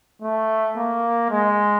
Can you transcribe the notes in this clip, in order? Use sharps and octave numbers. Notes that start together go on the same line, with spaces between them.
A3
A#3
G#3